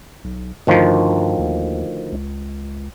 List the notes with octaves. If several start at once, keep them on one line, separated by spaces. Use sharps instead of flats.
B1
D2 G2 D#3 F3
D#2
C#2